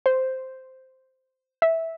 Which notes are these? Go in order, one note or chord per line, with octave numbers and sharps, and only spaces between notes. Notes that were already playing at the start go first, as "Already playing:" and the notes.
C5
E5